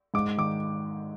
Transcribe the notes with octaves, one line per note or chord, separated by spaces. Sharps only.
G#2 D6
D#3 D6